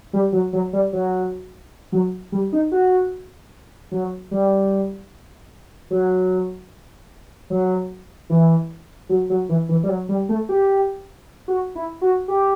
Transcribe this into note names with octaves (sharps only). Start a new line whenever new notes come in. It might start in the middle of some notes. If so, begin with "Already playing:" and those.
G3
F#3
F#3
G3
F#3
F#3
G3
D#4
F#4
F#3
G3
F#3
F#3
E3
F#3
F#3
E3
E3
G3
F#3
G3
A3
G4
F#4
E4
F#4
G4